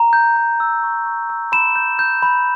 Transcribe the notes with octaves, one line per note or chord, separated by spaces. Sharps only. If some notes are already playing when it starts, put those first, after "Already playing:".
Already playing: A#5
G6
A#5
E6
C#6
C#6
E6
B5 E7
G6
G6
B5